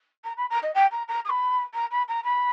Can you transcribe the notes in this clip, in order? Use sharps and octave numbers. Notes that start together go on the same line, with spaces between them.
A#5
B5
A#5
D#5
G5
A#5
A#5
D#6
B5
A#5
B5
A#5
B5